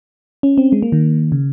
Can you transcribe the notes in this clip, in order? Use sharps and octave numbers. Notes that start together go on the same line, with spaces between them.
C#4
C4
G#3
A#3
D#3
C#3